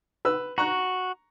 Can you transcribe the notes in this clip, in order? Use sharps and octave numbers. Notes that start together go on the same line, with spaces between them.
B4 E6
F#4 A#5 C#6 F#6